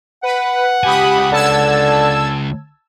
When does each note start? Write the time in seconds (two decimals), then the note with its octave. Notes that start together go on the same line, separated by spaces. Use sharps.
0.23 B4 F#5
0.84 C#2 G4 G#5 B5 D#6
1.32 D3 A5 E6 G#6